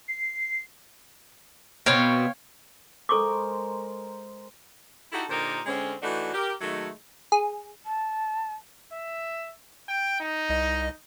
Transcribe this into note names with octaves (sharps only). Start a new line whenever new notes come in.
C7
B2 B3 C4 C#5 F5 G5
G#3 A4 A#4 C5 C#6 D6
D#4 E4 F#4 G4 A4
A#2 D3 D#4 G4 A#4 C5
D3 G#3 C4 C#4
E3 A3 D4 D#4 F#4
G4 A#4
D#3 F#3 G#3 A3
G#4
A5
E5
G5
D#4
C2 D#5